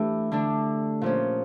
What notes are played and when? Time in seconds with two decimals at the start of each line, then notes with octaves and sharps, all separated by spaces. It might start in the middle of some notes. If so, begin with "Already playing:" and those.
Already playing: E3 A3 D4 E4 G4
0.32 D3 A3 D4
1.01 A#2 F3 C#4